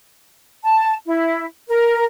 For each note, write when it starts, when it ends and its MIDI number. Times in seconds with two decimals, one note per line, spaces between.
0.64 0.94 81
1.06 1.45 64
1.69 2.04 70